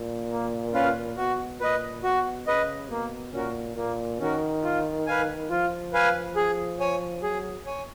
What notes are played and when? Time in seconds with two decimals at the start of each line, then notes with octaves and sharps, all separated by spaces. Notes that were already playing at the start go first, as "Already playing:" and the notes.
Already playing: A#2
0.31 A#3
0.74 C#4 F4 B4 F5
1.17 B2 F#4
1.60 A#2 B4 D#5
2.04 B2 F#4
2.47 C#3 B4 D#5
2.90 B2 A#3
3.33 A#2 C#4 F#4 A#4
3.76 A#2 A#3
4.20 D#3 C#4 F#4 A#4
4.63 F4
5.07 B4 F5 G#5
5.50 F3 F4
5.93 B4 F5 G#5
6.36 G#4
6.80 C#5 G#5
7.23 F#3 G#4
7.66 C#5 G#5